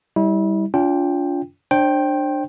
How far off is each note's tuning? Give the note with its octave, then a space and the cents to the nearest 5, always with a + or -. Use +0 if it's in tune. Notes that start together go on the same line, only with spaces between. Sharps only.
G3 +0 E4 -35
D4 -45 F4 +0 G5 +5
D4 +15 C5 +35 G5 +0